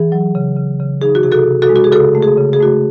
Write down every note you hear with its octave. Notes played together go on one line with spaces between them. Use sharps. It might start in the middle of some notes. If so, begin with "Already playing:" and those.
Already playing: E3 G#4
F#3
C#3
C#3
C#3
D#4 G#4
F#4
C3 G#4
F#4 A4
C3
F#4 A4
G#3
F#4
G#4
C#3 F#4 A4
A3
G#4
C#3
G#4
A3 F#4